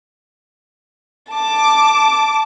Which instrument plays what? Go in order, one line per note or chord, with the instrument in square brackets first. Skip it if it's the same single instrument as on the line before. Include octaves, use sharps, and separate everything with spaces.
[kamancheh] A5 D6